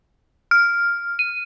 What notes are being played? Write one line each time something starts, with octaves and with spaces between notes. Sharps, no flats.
F6
D#7